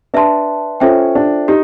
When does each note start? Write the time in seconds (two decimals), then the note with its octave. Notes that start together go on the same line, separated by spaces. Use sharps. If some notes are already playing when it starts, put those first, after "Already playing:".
0.14 D4 B4 E5 A5 C6
0.80 C#4 F4 A4 C5 E5 G5
1.15 D4
1.48 D#4 G4